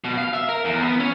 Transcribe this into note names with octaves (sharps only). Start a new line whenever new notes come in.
B2
F5
E5
A#4
E2
B3
C#4